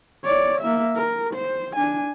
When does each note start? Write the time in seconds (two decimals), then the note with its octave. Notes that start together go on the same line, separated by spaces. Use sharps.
0.24 C#5 D5
0.61 A#3 E5
0.95 A#4
1.34 C5
1.76 D4 G#5